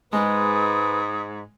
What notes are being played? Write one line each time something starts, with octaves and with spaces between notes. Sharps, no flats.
G#2 G#3 B4 D#6